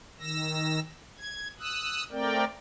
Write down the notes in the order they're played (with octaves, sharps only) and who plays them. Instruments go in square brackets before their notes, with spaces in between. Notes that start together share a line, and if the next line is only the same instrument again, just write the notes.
[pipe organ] D#3 E6 A#6
G#6
D#6 E6 F#6
A3 C4 A#4 D5 G5